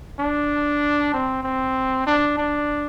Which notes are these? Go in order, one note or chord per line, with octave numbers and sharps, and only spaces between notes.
D4
C4
C4
D4
D4